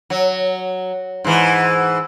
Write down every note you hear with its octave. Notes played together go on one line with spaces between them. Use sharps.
F#3
G#2 E3